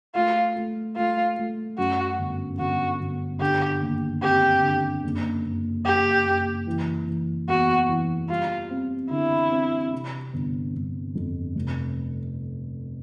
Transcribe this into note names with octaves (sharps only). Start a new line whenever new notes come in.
A3 F4
A3
A3 F4
A3
F#2 F#4
G1
G1 F#4
G1
D3 G4
D#2
C4 G4
D3
F#1
F#1
F#1 G4
F#1
E3
E3
E2 F#4
E3
G3 F4
C4
D3 E4
C4
C3
G1
G1
F2
F1